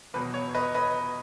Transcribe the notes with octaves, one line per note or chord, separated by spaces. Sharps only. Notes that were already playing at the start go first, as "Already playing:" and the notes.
E2 B2 F#3 B4
C#5
B4 D#5
B4 D#5